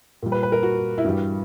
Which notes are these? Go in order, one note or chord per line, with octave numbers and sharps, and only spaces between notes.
A#2 G3
B4
B4
A#4
F#4
E4
G2 E3 G3 F#4